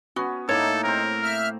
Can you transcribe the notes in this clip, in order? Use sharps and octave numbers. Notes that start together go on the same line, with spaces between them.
B3 C#4 F#4
A2 A#3 D#4 A4 C#5 D6
C4 A#4 C5
E5 F6